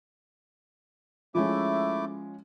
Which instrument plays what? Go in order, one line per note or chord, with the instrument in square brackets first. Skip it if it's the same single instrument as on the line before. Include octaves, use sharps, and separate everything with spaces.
[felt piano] F3 G#3 C#4 [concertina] A3 E4 D6